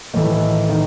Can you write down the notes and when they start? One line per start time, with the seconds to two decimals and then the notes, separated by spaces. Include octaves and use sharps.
0.14 A2 D#3 E3 A3 D#4
0.69 D#3 D#4